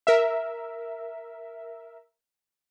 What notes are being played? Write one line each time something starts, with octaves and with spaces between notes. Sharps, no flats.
A#4 E5